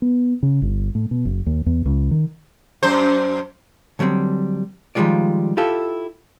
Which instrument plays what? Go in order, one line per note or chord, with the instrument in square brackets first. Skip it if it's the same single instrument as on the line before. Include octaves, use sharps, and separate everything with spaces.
[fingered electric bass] B3
C#3
G1
A2
B2
F#1
D#2
E2
C#2
D#3
[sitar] F#2 C5
[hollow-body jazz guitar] D3 F#3 G3 A#3 C4
D#3 F3 G3 G#3 F4 D5
E4 F4 G4 A4